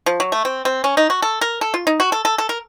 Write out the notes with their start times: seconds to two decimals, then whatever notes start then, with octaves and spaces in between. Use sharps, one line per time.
0.06 F3
0.20 F#3
0.32 A3
0.45 C4
0.65 C4
0.84 C#4
0.97 D#4
1.10 F#4
1.22 A4
1.41 A#4
1.61 A4
1.74 F4
1.87 D#4
2.00 F#4
2.12 A4
2.25 A4
2.38 A4
2.49 A#4